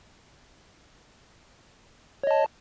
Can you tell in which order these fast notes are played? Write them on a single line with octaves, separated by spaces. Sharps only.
C#5 D#5 A5